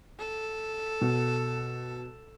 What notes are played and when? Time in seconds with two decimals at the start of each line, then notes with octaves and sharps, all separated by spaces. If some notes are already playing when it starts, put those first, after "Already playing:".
0.19 A4
1.01 B2